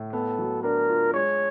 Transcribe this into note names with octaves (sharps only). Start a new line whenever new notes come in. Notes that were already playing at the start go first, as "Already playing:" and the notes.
Already playing: A2
B3 A4
F#3
D4 A#4
F4
G#3 C#5